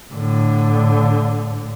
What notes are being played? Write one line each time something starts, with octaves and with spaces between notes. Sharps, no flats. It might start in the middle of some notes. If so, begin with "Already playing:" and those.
A2 D3